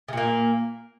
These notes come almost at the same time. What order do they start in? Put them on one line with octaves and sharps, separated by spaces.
C#3 A#2 A#3